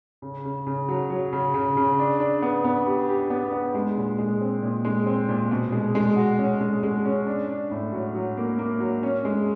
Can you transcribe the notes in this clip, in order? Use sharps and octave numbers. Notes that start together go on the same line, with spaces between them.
C#3
C#3
C#3
F#3
F#3
C#3
C#3
C#3
D4
D4
B3
B3
G4
G4
B3
B3
G#3
A#2
G#3
C4
A#2
G#3
C4
A#2
B2
G#3
G#3
F#4
C#4
G#3
G#3
C#4
D4
D4
A2
F#3
F#3
A#3
A#3
F#3
C#4
G#3